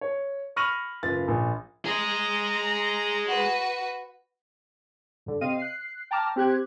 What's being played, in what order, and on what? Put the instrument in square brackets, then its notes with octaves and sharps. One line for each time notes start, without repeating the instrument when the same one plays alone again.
[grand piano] C#5
B5 C#6 F6 A#6 D#7 F#7
F#1 F4 B4 A6
A#1
[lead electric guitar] G#4 D#5 [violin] A#5
[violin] F#4 B4
[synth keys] G2 D3
C3 C4 D#5 F5 D#7
F#6 C7
G5 A5 A#5 D6 F6
C4 G4 F#6 G#6